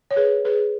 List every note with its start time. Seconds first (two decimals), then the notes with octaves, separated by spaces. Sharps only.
0.11 C#5
0.16 G#4 B4
0.45 G#4 B4